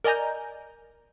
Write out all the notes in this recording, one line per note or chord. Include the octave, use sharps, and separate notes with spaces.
A#4 D5 D#5 G#5 A#5 G6